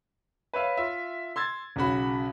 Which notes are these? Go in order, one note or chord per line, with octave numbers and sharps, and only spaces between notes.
B4 C#5 E5 F5
F4 E5
C6 E6 G#6 A6
B1 C#3 F#4 B5